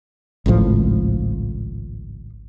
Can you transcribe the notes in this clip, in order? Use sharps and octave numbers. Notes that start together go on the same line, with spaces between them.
G#1 C#2 A2 F3